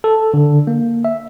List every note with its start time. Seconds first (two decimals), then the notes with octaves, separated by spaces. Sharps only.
0.04 A4
0.34 D3
0.67 A#3
1.05 E5